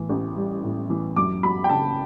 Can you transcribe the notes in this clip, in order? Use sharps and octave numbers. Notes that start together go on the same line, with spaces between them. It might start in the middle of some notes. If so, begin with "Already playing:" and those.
Already playing: A2 E3
A1
G3
A2
E3
F#2 D6
F#3 B5
G5
F#1 A5